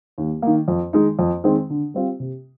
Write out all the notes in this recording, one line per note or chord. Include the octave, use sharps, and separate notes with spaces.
D#2
D#3 A#3
F2
D#3 G#3 D#4
F2
D#3 G#3 C4
D3
G3 C4 F4
C3